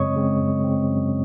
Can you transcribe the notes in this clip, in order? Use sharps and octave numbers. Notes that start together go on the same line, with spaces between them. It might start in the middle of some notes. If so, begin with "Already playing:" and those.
Already playing: F#2 C#3 G#3 C4 C#5 D#5 C#6 D#6
C#3 G#3 C4
F#2
C#3 G#3 C4
F#2